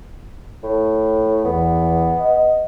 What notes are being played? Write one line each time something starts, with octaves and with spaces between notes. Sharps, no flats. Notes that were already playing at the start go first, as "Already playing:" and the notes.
A2
E2 B3
D#5